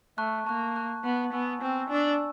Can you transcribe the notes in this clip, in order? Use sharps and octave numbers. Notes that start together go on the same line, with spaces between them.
A3 A5 C#6 F#6
A#3 A5 C#6 F#6
A5 C#6 F#6
B3 A5 C#6 F#6
B3 G#5 C#6 E6
C4 G#5 C#6 E6
D4 G#5 C#6 E6